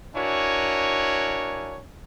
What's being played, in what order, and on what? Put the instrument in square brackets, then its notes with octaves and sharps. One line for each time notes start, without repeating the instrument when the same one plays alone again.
[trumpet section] D4 E4 F#4 A#4 C#5 G#5